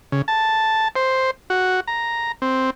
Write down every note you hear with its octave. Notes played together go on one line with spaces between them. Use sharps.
C#3
A5
C5
F#4
A#5
C4